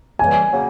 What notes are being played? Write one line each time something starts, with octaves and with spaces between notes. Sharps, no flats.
C#3 E3 G3 A#3 G#5
C#3 F#3 A#3